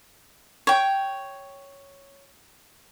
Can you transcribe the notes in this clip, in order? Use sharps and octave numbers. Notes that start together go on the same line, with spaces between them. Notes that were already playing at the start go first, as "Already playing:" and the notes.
C#5 G5